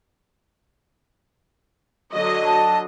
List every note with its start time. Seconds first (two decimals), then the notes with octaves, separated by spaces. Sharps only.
2.12 D3 F#3 D#5
2.46 A5